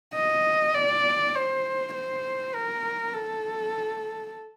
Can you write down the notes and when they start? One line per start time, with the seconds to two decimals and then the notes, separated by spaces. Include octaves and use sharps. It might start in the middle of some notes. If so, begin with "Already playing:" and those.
0.14 D#5
0.74 D5
1.35 C5
1.94 C5
2.54 A#4
3.14 A4